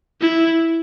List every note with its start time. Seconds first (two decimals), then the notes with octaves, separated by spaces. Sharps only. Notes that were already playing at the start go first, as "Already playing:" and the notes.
0.21 E4